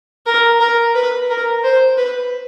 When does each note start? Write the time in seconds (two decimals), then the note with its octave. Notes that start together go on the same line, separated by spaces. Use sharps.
0.26 A#4
0.60 A#4
0.95 B4
1.30 A#4
1.64 C5
1.98 B4